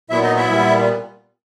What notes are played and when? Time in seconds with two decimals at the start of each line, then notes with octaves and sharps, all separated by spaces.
0.10 A#2 F#3 B3 E4 E5
0.23 D#4 D#5
0.36 E4 E5
0.49 A#2 G3 B3